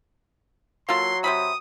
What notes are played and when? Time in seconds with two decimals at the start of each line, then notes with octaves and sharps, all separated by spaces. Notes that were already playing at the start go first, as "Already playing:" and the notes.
0.89 F#3 A#3 F4 A4 C6
1.24 C3 C4 B5 D#6